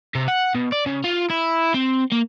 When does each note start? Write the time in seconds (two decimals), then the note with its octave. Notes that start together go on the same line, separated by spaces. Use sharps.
0.15 C3
0.28 F#5
0.55 B2
0.72 D5
0.86 C#3
1.04 F4
1.30 E4
1.74 C4
2.12 A#3